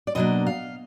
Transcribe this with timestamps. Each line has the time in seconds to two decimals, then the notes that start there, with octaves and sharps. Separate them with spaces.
0.07 D5
0.15 B2 F#3 A#3 D4 D#5
0.46 F5